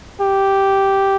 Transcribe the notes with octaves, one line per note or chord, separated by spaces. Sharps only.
G4